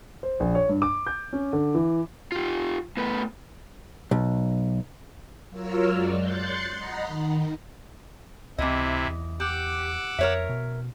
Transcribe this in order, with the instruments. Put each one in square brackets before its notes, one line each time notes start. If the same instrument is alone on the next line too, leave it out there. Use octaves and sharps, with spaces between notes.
[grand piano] C5
A#1
C#5
G2
D6
G6
C#4
D3
E3
[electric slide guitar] F4 G4
A2 A3 B3 B4
[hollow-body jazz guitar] B1
[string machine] F#3 F4 A#4 C#5 E6 F6
F#2 F#3 G#3 D5
C6 F#6 G6 A6 C7 C#7
D#5 F#5 A#5 B5
D#3
[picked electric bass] C#2 C4 [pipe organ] C3 E4 [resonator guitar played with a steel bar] E3 D#5
[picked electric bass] E2
[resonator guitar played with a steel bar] G4 [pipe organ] F#5 D6 E6
[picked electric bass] F2 [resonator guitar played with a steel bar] A#4 C#5 E5
[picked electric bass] B2